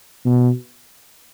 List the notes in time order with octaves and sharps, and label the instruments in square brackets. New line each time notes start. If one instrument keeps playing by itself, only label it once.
[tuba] B2